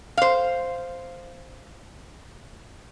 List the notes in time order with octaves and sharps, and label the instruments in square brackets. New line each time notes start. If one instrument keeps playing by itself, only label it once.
[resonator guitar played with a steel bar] C5 F5